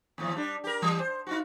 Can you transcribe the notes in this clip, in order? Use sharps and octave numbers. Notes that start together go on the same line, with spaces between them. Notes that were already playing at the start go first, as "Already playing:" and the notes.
D#2 A2 F3
G3 D4
G4 A#4
E3 G3
C5
D#4 F4 F#4